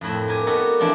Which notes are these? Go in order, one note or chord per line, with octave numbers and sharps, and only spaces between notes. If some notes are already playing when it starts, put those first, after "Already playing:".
F2 A2 C4
G4 A#4 G#5
B3 D#4 F#4 G4 A4 A#4
E3 F3 C4 D4 F4 G5